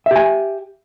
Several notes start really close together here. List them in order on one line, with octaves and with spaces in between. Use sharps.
E5 G4 G#5